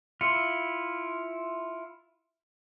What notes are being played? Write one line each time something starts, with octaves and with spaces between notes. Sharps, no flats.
E4 F4 C6 C#7